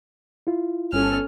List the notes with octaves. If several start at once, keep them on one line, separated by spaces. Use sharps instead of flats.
E4 F4
G1 C#4 A4 F6